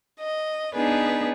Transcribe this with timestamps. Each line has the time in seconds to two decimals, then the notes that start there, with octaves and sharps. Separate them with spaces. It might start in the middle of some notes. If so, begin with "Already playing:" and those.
0.19 D#5
0.75 B3 D4 D#4 G#4 B4